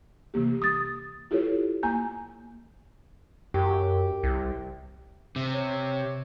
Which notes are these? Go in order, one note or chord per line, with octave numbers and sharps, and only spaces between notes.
C3 E3 A#3 G4
D#6 A6
E4 F4 G4 A4 B4 C#5
A#3 G#5 A#5 G6
F#2 G4
C2
C3
C#5